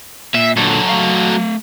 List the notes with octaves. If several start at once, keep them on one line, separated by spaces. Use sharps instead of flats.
A#2 E5
A#2 D3 F#3 A4
A3 F5